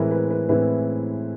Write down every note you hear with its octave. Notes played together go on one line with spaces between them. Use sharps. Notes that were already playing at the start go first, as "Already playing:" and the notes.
Already playing: A2 E3 G#3 C4 E4 A#4 B4
B4
B4
A2 E3 G#3 C4 E4 B4